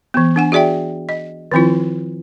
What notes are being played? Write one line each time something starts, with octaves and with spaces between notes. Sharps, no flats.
E3 B3
D4 F#5 G#5
F#4 G#4 D5 E5 G5
D#5
D#3 F3 C4 E4 F4